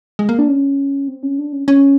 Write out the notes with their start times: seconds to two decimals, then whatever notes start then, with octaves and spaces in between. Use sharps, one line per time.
0.19 G#3
0.29 A#3
0.39 D4
0.48 C#4
1.08 C4
1.23 C#4
1.39 D4
1.53 C#4
1.68 C#4